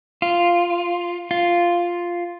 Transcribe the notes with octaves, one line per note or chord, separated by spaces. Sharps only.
F4
F4